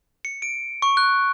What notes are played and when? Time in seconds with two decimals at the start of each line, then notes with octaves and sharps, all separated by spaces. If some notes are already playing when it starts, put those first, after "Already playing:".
0.25 C#7
0.42 D7
0.82 C#6
0.97 F#6